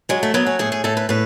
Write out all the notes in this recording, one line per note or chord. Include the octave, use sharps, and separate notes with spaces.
F#3 G#3
A3
F#3 B3
C#4
A2 G#4
G#4
A2 A4
B4
A2 B4